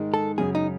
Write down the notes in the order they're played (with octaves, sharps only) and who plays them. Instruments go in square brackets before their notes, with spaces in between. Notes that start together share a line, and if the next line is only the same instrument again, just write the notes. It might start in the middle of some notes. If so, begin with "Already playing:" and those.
Already playing: [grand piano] G#2 D#3 G#3
[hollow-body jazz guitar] A4
[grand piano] F#2 C#3 F#3 [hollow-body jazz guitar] G#4
[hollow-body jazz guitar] D#4